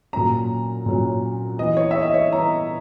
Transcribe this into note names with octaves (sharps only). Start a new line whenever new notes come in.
A#2 F#3 C#4 A#5
A#2 F#3 C#4
E3 B3 D#5
C#5
E5
D#5
C#5
E3 B3 A#5